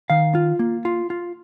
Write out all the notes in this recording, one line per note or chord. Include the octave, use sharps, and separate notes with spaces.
D#3 F5
F4
A#3
F4
F4